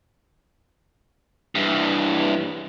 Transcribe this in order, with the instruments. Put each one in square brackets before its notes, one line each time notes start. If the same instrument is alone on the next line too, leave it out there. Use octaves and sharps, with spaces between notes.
[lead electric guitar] G2 E3